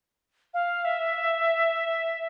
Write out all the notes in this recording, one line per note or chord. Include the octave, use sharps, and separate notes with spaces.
F5
E5